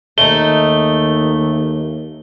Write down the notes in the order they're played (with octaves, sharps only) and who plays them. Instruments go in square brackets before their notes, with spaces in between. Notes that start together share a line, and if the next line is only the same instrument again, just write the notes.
[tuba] D#2 [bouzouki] A3 D#4 [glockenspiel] G7